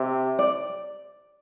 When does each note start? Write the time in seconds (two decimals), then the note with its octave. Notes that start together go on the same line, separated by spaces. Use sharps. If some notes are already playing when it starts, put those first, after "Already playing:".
Already playing: C3 E5
0.39 D5